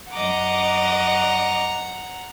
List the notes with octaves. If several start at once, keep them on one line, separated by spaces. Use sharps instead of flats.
F#2 D#5 F#5 A#5 D6